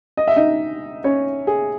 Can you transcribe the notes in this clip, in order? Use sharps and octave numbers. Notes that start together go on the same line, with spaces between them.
D#5
E5
D#4 D#5
C#4 C#5
G#4